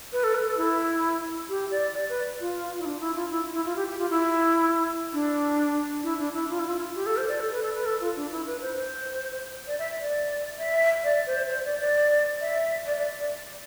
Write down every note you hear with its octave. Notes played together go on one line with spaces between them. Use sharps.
B4
A4
B4
A4
E4
G4
D5
D5
B4
F4
E4
D4
E4
F4
E4
E4
F4
G4
G4
F4
E4
D4
E4
D4
E4
F4
E4
F4
G4
A4
C5
D5
A4
B4
A4
B4
A4
F4
D4
E4
B4
C5
C5
D5
E5
D5
E5
D5
C5
C5
D5
D5
E5
D5
D5
D5